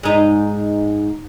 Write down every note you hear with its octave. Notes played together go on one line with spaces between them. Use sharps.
G#2 D#4